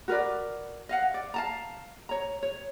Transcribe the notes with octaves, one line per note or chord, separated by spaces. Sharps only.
F#4 A#4 B4 D5
D#5 F5 F#5
D5
F5 A5 A#5
C#5 A#5
C#5